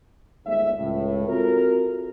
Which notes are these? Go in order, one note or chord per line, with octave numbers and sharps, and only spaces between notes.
G1 D#2 G#3 E5
C#2 A2
C4 F4 F#4 A4 A#4